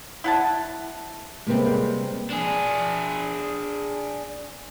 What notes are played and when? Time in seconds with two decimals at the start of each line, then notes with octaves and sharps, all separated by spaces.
0.24 E4 F#5 A5
1.47 C3 G3 G#3 A#3 C4 B4
2.30 D4 G#4